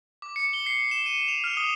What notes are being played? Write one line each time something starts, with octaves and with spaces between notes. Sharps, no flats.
D6
C#7
G7
C7
E7
D#7
F7
F6
D#6